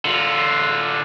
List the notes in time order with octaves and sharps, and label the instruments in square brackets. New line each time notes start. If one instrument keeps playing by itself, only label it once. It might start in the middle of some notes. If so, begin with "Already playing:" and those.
[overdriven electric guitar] D3 F4